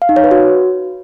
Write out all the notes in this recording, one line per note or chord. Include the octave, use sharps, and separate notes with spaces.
F5
D#4
C#5
B4
F#4